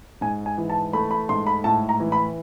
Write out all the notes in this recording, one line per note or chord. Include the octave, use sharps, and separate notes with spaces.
G#2 G#5
G#5
E3
A5
A3 B5
B5
G#2 C6
B5
A2 A5
A#5
E3
B5